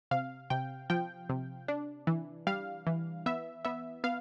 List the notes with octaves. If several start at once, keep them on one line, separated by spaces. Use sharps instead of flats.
C3 F5
C3 G5
F3 G5
C3
D4
E3
G3 F5
E3
B3 E5
B3 E5
B3 F5